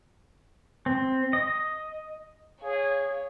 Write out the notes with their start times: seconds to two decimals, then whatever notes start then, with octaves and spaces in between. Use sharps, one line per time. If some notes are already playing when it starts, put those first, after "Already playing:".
0.86 C4
1.33 D#5
2.62 G#4 C#5 F5